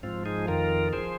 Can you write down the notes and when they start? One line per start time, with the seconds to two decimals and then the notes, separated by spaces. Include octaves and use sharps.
0.03 G#2 F3 C4 F4
0.26 D#4 G#4
0.48 F2 D#3 F4 A#4
0.93 F3 G#4 C5